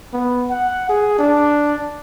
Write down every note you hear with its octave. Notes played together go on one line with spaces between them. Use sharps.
B3
F#5
G#4
D4